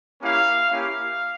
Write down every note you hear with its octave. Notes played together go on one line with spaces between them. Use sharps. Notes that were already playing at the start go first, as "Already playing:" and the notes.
A#3 C#4 E4 G4 F5
A#3 C#4 E4 G4 F5